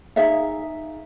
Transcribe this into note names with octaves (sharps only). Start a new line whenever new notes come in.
D#4 G#4 E5 F5